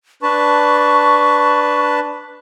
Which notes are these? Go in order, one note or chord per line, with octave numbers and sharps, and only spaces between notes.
D4 B4 A5 C#6